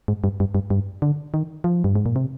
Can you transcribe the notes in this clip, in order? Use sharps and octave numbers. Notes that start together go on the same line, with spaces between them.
G#2
G2
G2
G2
G2
D3
D#3
F3
G2
G#2
A#2
C3